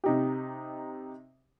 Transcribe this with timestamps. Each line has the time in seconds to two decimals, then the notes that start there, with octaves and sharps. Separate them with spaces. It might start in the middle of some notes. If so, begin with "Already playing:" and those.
0.04 C3 D#4 G4